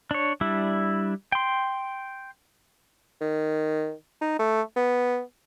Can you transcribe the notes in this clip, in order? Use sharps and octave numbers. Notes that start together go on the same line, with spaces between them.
D4 C#5
G3 D4 E4
G5 C6
D#3
D#4
A3
B3